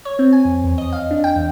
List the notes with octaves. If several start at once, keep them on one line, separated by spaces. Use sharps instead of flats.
C#5
C4
G#5
F2
E2
D#5
F5
D4
G5
E2